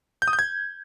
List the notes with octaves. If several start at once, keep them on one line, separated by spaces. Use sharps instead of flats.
G6
D#6
G6
G#6